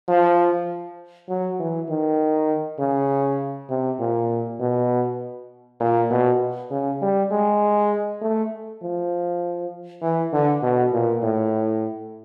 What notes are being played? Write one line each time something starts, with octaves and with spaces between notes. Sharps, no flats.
F3
F#3
E3
D#3
C#3
C3
A#2
B2
A#2
B2
C#3
G3
G#3
A3
F3
E3
D3
B2
A#2
A2